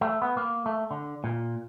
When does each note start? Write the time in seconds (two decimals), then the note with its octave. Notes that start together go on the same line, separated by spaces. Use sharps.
0.01 A3
0.22 B3
0.37 A#3
0.66 A3
0.91 D3
1.24 A#2